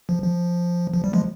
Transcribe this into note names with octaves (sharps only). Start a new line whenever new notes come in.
F3
F3
F3
G3
F3 G#3